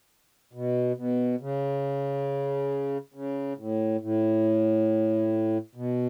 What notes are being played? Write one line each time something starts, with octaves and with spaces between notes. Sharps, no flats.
B2
B2
C#3
C#3
A2
A2
B2